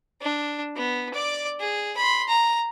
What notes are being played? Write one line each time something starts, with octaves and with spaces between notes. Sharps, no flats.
D4
B3
D5 D6
G#4
B5 C6
A#5